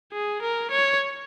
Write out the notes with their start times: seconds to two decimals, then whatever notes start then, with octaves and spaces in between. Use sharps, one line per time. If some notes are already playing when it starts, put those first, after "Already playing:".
0.13 G#4
0.42 A#4
0.71 C#5